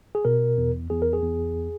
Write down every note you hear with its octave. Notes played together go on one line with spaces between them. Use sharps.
G#4
B2 A#4
E2
E2 G#4
A#4
G#4
E2